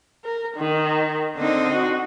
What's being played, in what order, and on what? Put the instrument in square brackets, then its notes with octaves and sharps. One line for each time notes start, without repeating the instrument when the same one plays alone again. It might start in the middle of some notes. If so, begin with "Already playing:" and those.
[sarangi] A#4
D#3
[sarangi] D3 [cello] C4 D#4
[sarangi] F#4